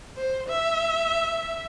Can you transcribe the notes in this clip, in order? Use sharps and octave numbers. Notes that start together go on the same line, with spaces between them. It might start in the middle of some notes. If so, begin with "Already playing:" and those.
C5
E5